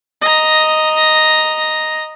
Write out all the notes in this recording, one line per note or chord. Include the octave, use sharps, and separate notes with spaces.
D#5 A#5